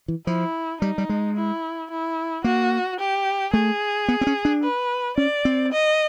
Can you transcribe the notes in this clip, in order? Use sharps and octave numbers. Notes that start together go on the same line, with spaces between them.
E3
F3 E4
G3 D#4
G3
G#3
E4
E4
A#3 F#4
G4
A3 G#4
B3
C4
C#4
D4
B4
C#4 D5
C4
D#5